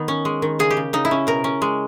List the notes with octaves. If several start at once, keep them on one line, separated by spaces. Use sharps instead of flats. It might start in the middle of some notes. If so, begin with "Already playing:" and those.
Already playing: D#3 B3
C#4
G#3
D#3
C#3 G#4
G4
C#3
C#3 D#4
E4
C#4
B2 A#4
C#4
G#3